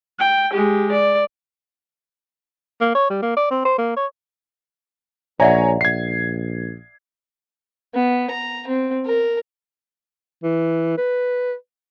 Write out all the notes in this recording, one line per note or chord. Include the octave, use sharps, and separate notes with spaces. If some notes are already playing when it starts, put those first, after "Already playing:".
G5
G#3 G4
D5
A#3
C#5
G3
A#3
D5
C4
C5
A#3
C#5
A#1 C#5 D5 E5 F#5 G#5 A#5
A#1 G#6 C7
B3
A#5
C4
A#4
E3
B4